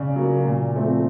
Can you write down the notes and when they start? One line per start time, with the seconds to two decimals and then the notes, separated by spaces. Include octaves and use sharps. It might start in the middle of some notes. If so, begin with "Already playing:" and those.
Already playing: C#3 D5
0.16 F#3 A#3
0.45 A#2
0.74 F3 A3 C4